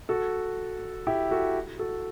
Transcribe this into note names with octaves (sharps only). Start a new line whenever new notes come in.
F#4 A4
E4 G4
F#4 A4
F#4 A4